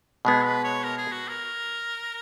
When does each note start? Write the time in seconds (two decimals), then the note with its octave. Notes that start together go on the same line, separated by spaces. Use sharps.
0.25 B2 G#3 B3 G#4
0.45 B4
0.64 C#5
0.83 A#4
0.98 G#4
1.12 F#4
1.28 A#4